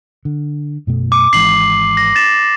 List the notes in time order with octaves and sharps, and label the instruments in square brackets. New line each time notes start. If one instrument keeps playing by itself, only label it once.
[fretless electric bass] D3
F#2 B2 A3
[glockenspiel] D6
[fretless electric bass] G#1 E3 G#3 [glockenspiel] C7 F#7
[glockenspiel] A#6
A6 E7